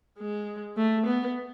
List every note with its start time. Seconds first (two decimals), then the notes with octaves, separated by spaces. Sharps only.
0.18 G#3
0.77 A3
1.06 B3